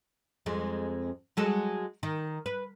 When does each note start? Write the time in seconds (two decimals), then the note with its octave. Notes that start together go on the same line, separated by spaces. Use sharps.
0.46 F2 G#3
1.37 F#3 G#3 A4
2.03 D#3
2.46 B4